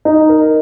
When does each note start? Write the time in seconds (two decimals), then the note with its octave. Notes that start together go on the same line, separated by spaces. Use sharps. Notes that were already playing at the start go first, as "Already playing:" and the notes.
0.05 D#4
0.29 A#4